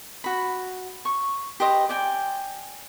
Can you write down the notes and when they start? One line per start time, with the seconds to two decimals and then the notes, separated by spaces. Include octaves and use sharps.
0.24 F#4 B5
1.05 C#6
1.60 G4 B4 C5 D#5
1.89 D5 G5 G#5